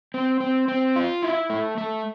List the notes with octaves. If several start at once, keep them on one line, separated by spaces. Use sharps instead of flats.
C4
C4
C4
F4
E4
A3
A3